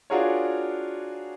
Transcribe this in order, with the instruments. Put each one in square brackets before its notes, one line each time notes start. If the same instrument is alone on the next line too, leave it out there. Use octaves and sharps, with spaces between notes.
[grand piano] D4 F4 F#4 G#4 A#4 C#5